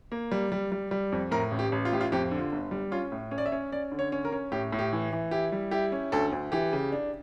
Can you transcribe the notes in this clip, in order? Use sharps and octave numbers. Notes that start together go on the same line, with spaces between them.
A#3
G3
G3
G3
G3
F2
A2 A#4
A1
G4
A1
F4
A2 G4
F4
F2 G4
D3
F4
G1
G3
C#4 F4
A2
C#4
D5
E5
C#4
C#4 D5
D3
C#5
C#4
A#4
C#4
A2 G4
A2
G4
E3
E3
E4 G4
G3
E4 G4
C#4
D2 A4
D2
E3 G4
C#3
D4